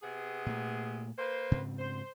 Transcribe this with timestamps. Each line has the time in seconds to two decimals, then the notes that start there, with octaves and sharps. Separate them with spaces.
0.02 C3 B3 G#4
0.46 A#2 A3
1.18 A#3 B4 C5
1.51 G#2 C#3 C4
1.79 C5